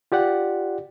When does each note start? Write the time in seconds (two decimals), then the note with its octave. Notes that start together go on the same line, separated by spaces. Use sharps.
0.12 F4 G4 D5 F#5